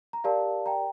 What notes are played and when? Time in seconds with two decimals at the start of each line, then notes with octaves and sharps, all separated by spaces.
0.13 A#5
0.24 G4 A#4 D5 F5 A5
0.66 G5 A#5